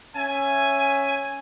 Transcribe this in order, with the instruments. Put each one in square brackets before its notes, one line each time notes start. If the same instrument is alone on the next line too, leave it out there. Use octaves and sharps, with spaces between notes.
[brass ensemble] C#4 E5 G#5